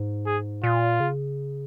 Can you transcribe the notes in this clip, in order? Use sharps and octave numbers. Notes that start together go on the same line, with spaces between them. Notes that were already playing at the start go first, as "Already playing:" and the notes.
Already playing: G#2
G#4
A#2 F4
C#3